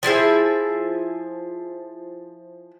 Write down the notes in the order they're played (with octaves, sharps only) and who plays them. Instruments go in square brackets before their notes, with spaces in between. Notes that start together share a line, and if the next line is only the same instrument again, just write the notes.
[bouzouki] F3 E4 G#4 E5